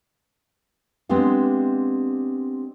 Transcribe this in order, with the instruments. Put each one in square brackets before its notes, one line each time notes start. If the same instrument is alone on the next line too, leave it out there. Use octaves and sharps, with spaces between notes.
[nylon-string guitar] G#3 B3 C4 D4 G4 F5